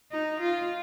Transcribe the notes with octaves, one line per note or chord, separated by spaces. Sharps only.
D#4
F4